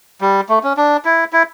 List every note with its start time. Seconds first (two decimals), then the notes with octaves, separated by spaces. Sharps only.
0.21 G3
0.49 A3
0.63 C#4
0.77 D4
1.05 E4
1.33 E4